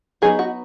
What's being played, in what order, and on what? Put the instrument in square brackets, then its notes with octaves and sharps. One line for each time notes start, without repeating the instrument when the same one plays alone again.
[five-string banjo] F#3 B3 D#4 G#4
F#4